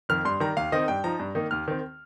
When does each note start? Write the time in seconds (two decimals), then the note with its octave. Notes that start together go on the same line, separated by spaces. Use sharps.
0.09 F2 D#3 F6
0.25 G2 C6
0.40 D#3 G3 A#5
0.57 D#2 F5
0.72 D#3 C4 D#4 D#5
0.88 G2 G5
1.04 F3 D#4 A#5
1.19 G2
1.35 D#3 A#3 D#4
1.51 D#2 F6
1.68 D#3 C4